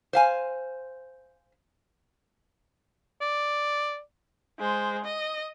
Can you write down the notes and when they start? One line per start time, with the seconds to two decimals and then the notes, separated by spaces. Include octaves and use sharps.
0.13 C5 F5 G#5
3.22 D5
4.59 G#3 C5
5.04 D#5